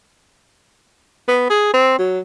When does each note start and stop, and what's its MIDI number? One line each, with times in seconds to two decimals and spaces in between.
1.28 1.45 59
1.50 1.71 68
1.74 1.97 60
1.99 2.19 54